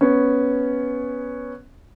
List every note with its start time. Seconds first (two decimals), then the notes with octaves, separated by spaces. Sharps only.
0.01 B3 C#4